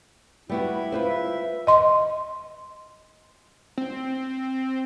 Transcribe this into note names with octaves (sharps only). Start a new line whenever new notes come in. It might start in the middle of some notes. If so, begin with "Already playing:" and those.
G3 B3 E4 F#4
F4 B4 C5
E5
D#5 C6
C4